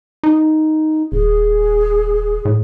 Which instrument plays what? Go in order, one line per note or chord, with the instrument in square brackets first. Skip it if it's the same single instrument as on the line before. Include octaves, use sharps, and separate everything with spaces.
[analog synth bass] D#4
[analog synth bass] D#1 [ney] G#4
[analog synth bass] A2